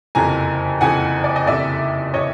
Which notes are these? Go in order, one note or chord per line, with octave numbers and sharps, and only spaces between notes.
F#1 F2 C3 E3 G#5 A#5
F#1 F2 C3 E3 F#5 G#5
D5
D#5
F#1 F2 C3 E3 D5 E5
C3 E3 C#5 D#5